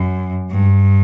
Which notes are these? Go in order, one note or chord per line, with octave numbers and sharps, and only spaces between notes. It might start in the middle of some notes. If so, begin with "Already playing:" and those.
Already playing: F#2
G2